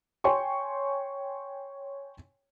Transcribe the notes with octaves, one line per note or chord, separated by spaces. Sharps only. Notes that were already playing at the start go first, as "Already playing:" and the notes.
C#5 G5 G#5 C6 C#6